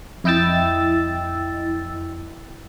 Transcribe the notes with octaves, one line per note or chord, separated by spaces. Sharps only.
F2 E4 D#5 G5 E6 A6